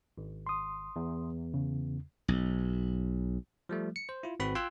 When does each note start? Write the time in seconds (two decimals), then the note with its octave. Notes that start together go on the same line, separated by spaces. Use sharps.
0.18 G#1
0.47 C6 D#6
0.96 E2
1.54 C#3
2.28 B1
3.69 F3 G3 A3
3.96 C#7
4.09 C5
4.23 E4 F4
4.40 G#1 C4 F#4 B4 B5
4.55 F4 G5 C6 E6 F#6 G#6